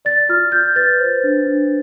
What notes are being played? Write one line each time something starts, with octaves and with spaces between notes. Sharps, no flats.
D5 A6
F4 F6
F4 G6
B4 A6
C5
D4
D4